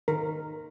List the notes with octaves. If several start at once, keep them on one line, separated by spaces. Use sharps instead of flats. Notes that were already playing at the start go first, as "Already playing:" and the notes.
D#3 A#4